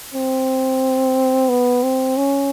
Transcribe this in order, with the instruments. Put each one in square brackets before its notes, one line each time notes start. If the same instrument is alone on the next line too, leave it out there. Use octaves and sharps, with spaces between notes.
[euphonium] C4
B3
C4
C#4